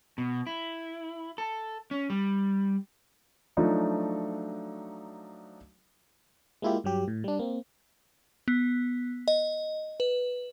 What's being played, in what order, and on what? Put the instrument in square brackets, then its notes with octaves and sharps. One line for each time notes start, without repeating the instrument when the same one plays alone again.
[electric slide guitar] B2
E4
A4
C#4
G3
[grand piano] F3 F#3 A3 D4 D#4 F#4
[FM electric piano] G#3 A#3 E4 F4 G4
G2 F#3 G4
A2
G3 D4
A#3 C4
[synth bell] B3
D#5
B4